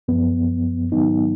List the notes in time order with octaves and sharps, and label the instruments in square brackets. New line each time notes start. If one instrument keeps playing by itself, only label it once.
[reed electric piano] F#2 F3 B3
G#2 D#3 F#3 B3 D#4